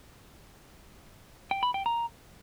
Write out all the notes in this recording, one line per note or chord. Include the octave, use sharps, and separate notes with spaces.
G5
B5
G5
A#5